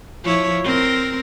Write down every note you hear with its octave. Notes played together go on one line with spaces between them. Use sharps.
F3 E4 C#5
C4 A#4